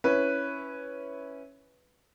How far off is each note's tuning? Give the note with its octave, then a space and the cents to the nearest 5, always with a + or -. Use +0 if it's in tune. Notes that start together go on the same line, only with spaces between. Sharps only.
C#4 +0 E4 -5 B4 +0